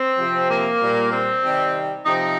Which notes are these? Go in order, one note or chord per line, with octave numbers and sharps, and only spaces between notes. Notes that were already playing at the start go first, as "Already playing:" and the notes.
Already playing: C4
C3 F3
A#3
A#2 G3
C4
C3 D#3 G3
C3 F3 D#4